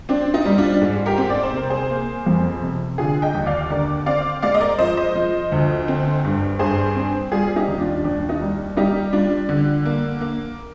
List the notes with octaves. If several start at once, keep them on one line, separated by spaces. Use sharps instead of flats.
C4 D4
D#4
G3
D4 F4
G#2
G4 A#4
C4
D5
C5
C3 A#4
G#4 C5
A#3
F2
C3
D3 F4 G#4
D#5 G5
D#2
D5 F5
D3 A#4 D5
C4 D5 F5
G#3 D5 F5
D#5
A#4 D5
F3 C5 D#5
C5 D#5
F3
D2
C4
G2
G2 G#4 C5
C4
G3 F4 G#4
D#4 G4
D#2
D4 F4
D#2 D4
D#4
G3
G3 D#4 G4
G3 D4 F4
D3
A#3
A#3